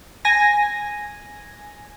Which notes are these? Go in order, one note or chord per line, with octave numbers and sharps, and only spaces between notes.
G#5 A#6